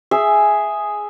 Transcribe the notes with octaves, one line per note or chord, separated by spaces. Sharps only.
G#4 E5